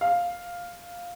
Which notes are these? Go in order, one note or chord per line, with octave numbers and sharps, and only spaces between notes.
F5